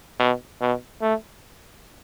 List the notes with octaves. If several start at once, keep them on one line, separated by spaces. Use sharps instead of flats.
B2
B2
A3